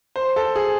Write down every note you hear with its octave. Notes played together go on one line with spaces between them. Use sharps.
C5
A4
G#4